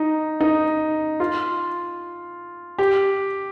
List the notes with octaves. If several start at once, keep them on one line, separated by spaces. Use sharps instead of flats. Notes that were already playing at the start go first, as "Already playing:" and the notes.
Already playing: D#4
D#4
F4
G4